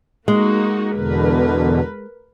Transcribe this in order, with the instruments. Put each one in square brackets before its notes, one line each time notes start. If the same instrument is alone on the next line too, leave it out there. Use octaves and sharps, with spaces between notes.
[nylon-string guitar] G#3 [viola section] A#3 D#4 F#4
[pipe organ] E2 B2 D3 [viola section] A#4 B4